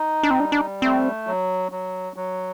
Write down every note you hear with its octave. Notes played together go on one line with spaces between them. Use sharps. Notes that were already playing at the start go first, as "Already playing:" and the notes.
Already playing: D#4
D4
C4
G3 D4
D4
A3 C4
F#3
F#3
F#3